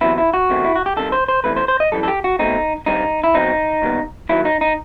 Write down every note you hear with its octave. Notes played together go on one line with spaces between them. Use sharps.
E2 C3 F#3 B3 E4
E4
F#4
E2 C3 D#3 A3 C4
E4
F#4
G4
C2 C3 D#3 A4
C5
C5
E2 C3 E3 A3 B4
C5
C5
D#5
F#2 E3 G3 A4
A4
G4
F#4
B2 A3 C4 D#4
G2 D#3 G3 C4 D#4
E4
B1 B2 F#3 C4 D#4
D#2 D#3 G3 B3
D#2 D#3 F#3 E4
D#4
D#4